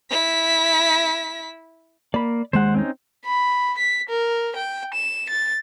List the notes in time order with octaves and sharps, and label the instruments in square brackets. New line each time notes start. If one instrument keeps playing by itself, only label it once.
[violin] E4 B6
[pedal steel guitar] A#3 [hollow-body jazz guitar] D5 B5
[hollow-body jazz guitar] D#2 G#3 [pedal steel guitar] C5 F#5
[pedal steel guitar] C4 C#4 D#4
[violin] B5
B6
A#4
G5
E7
A6